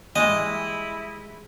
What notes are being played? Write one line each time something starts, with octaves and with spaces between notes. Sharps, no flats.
E3 G3 G#3 A#3 E4 D#5